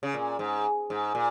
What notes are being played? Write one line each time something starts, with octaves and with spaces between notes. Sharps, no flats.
C#3
A#2
G#2
G#2
A#2